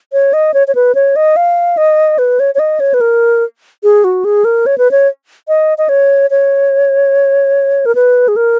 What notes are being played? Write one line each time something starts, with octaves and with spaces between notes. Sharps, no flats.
C#5
D#5
C#5
C#5
B4
C#5
D#5
F5
D#5
B4
C#5
C#5
D#5
C#5
B4
A#4
G#4
F#4
G#4
A#4
C#5
B4
C#5
D#5
D#5
C#5
C#5
A#4
B4
G#4
A#4